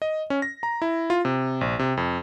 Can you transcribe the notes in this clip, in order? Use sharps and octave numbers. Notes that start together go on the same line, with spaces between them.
D#5
C#4
A#6
A#5
E4
F4
C3
A#1
C3
F2